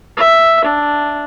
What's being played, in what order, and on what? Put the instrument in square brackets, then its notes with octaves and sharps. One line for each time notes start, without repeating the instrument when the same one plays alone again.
[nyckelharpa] E5
D4